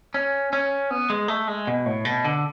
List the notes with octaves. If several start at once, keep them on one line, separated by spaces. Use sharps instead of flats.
C#4
C#4
B3
G#3
A3
G#3
B2
A2
B2
D3